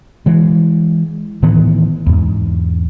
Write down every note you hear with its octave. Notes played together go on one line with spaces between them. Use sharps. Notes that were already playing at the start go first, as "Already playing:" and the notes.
E3 G#3
A2 D#3 E3 B3
E2 G#2